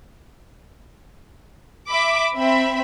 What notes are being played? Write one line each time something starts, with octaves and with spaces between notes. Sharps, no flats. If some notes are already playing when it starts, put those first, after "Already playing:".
E5 B5 D6
C4 E5 B5